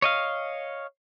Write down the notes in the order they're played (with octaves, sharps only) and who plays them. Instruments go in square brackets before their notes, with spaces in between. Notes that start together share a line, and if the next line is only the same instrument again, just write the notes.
[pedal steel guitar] C#5 D#5 F5